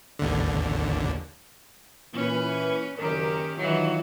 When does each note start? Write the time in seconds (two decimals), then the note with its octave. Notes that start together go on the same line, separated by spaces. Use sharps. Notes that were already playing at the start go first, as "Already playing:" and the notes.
0.19 A1 D#2 D3
2.13 A#2 E3 C#4 B4
2.98 F#1 D#3 C#4 G4 A#4
3.57 D#3 E3 F#3 D#4 F4